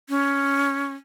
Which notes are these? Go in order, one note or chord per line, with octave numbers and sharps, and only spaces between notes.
C#4